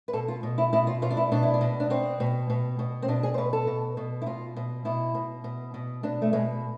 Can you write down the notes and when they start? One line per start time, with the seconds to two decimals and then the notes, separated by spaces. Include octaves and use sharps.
0.08 B4
0.13 B2 A4
0.28 F4
0.43 B2
0.58 E4
0.73 B2 E4
0.87 F4
1.02 B2 F4
1.10 D4
1.17 E4
1.32 B2 D4
1.43 E4
1.54 D4
1.61 B2
1.80 D4
1.90 B2 C4
2.20 B2
2.50 B2
2.79 B2
3.02 C4
3.08 B2 D4
3.23 G#4
3.34 C5
3.38 B2 B4
3.53 A4
3.67 B2
3.97 B2
4.22 E4
4.26 B2 F4
4.57 B2
4.85 B2 E4
5.15 B2
5.44 B2
5.74 B2
6.03 B2 D4
6.22 A3
6.33 B2 G#3